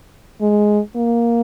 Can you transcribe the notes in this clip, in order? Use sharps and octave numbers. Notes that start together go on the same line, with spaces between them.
G#3
A#3